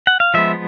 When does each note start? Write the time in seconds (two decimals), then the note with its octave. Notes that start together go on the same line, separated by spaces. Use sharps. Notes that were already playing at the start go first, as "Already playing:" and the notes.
0.07 F#5
0.20 F5
0.34 F3 G#3 B3 E5